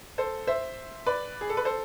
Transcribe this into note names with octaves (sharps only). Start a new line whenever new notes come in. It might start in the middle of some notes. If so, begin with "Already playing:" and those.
A4 C5
C5 E5
B4 D5
G#4
A4
B4
A4 C5